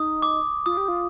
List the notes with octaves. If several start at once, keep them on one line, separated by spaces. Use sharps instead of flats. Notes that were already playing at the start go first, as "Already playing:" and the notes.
Already playing: D#4 D#6
D6
F4 D#6
G4
F4